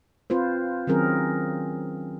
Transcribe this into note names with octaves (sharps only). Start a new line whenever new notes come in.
C4 F4 B4 C5
D#3 F#3 C4 C#4 G#4 A#4